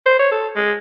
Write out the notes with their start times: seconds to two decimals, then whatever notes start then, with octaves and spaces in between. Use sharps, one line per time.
0.06 C5
0.19 C#5
0.31 A4
0.56 G#3